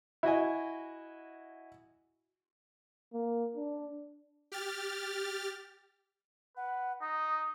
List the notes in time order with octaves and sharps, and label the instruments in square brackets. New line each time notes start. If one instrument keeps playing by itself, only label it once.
[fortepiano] E4 F#4 D#5 G#5
[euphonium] A#3
D4
[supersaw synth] G4 F6 A6
[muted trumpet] B4 [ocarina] F#5
[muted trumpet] D#4 [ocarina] D#6